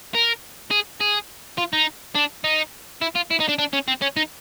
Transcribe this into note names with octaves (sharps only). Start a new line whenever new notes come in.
A#4
G#4
G#4
F4
D#4
D4
D#4
E4
F4
E4
D#4
D4
D4
C#4
C4
C#4
D#4